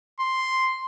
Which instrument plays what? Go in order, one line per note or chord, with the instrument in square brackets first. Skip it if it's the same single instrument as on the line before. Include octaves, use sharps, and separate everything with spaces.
[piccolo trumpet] C6